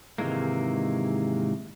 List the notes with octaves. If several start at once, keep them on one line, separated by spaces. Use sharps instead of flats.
G#2 C3 D#3 E3 G#3 A#3